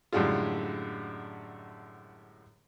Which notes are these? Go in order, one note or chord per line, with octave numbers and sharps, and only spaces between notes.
F#2 A2 D3 G3 G#3 F4